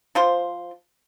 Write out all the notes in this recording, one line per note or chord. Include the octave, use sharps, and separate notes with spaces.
F3 F4 C5